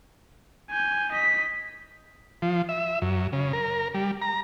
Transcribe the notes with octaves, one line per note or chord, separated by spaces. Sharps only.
G#5 G6
D#5 B6
F3
E5
F#2
C#3
A#4
G3
A#5